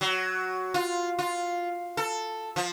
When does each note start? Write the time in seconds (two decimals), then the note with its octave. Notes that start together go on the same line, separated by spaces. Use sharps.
0.01 F#3
0.74 F4
1.19 F4
1.97 A4
2.56 F3